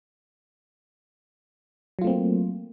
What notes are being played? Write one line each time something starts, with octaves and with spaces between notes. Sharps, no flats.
F#3 A3 A#3 C4 F4